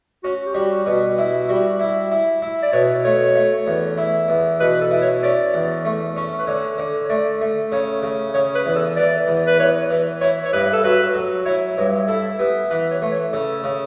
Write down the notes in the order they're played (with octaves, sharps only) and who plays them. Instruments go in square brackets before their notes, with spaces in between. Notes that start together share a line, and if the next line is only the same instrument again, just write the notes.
[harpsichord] C#4 [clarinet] F#4
[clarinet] G4
[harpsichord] G3 [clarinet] F#4
[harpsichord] B2
E4
[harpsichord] G3 [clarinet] F#4
[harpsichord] E4
E4
E4
[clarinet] D5
[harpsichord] B2 [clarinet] C#5
[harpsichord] A3 [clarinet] C#5
[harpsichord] A3
E2
E4
E2
[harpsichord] B2 [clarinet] B4
[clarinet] A4
[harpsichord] E4
[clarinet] C#5
[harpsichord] C#4 [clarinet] D5
[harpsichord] E2
A3
C#4
[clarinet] B4
[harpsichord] D3 [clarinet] C#5
[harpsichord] D3
[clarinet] C#5
[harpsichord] A3 [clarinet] D5
[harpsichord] A3
[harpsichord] C#3 [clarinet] C#5
[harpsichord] C#3
[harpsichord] C#3 [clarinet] C#5
[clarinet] B4
[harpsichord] E2
[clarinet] A4
[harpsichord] E3 [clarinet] D5
[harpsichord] E2
[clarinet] B4
[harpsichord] E2 [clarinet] C#5
[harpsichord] E3
[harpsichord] E4 [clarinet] C#5
[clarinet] C#5
[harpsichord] G2 [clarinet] B4
[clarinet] A4
[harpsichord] F#3 [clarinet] B4
[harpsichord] F#3
[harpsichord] E4 [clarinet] C#5
[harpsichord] G2 [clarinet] C#5
[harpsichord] E4 [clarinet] A4
[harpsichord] B3 [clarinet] G4
[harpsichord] E3 [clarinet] B4
[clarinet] C#5
[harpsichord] A3
[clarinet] C#5
[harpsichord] C#3 [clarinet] A4
[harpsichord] C#3